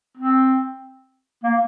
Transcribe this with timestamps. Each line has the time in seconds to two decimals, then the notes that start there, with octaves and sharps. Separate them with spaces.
0.17 C4
1.44 A#3